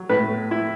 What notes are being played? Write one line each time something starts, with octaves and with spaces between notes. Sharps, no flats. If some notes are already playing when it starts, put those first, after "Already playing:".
Already playing: F#3
A2 B4
E4